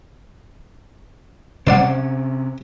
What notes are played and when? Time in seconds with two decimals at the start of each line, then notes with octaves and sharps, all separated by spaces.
1.67 C3 C#4 C5 D5 F#5